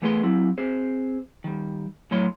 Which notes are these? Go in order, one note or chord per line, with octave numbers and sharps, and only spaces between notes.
E3 A3 B3 G#4 D5 C6
F#3 C4 E4
C4 G#4 C5
D#3 G3
A2 F#3 C#5 C6